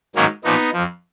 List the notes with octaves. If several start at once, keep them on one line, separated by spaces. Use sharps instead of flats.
G#2 D#3 F#3 A#3 C#4
A#2 F3 B3 D#4
F2 F3